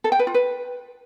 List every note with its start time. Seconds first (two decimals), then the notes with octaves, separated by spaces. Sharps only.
0.04 A4
0.12 G5
0.19 B4
0.27 F4
0.34 B4